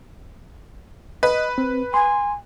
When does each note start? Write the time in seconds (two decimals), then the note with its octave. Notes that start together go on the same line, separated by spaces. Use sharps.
1.23 B4 D#5
1.58 C4
1.94 G#5 C6